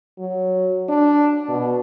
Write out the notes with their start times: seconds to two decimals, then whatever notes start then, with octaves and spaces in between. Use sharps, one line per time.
0.19 F#3
0.89 D4
1.49 B2